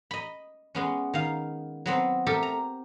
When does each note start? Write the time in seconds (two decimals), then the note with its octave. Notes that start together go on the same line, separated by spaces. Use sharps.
0.11 D#5 B5
0.75 G#3 B3 C#4
1.14 D#3 F5
1.86 F#3 B3 C4
2.26 A3 G4 A4 A#4
2.43 A#5